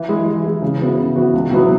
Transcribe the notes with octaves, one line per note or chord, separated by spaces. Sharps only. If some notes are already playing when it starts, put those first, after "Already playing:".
Already playing: E3
G#3 E4 G#4
E3
G#3 E4 G#4
C#3
E3 B3 F#4
C#3
E3 B3 F#4
C#2
B2 F#3 B3 E4